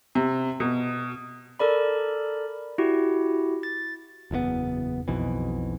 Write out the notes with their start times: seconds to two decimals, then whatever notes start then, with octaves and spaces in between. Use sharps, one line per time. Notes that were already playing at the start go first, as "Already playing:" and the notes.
0.15 C3
0.60 B2
1.59 A4 A#4 D5 B5
2.78 E4 F#4 G4
3.63 A6
4.31 F#1 E2 C#3 B3
5.08 B1 F2 B2 E3